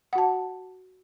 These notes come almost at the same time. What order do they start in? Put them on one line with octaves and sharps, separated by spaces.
F#5 F#4 A5